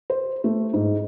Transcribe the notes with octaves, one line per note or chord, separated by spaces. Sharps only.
C5
A3
G#2